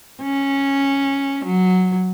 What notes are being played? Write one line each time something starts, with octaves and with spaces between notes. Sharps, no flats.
C#4
F#3